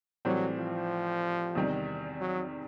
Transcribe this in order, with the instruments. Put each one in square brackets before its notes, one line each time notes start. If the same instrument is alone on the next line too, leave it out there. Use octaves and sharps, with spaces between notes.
[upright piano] A2 E3 G3 C4 [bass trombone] F#3
[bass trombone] F3
[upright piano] E2 C3 D#3 G3
[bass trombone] F#3